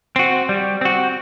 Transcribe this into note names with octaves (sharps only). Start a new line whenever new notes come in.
C4 F#4
G3
C4 F#4